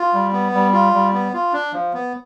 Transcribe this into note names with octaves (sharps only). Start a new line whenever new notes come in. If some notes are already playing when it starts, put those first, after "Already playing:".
Already playing: F4
G3
B3
G3
F4
G3
B3
F4
D4
F3
B3